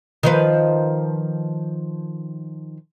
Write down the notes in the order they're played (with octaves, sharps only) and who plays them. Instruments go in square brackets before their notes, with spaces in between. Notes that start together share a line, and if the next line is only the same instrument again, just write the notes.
[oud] D#3 F3 B4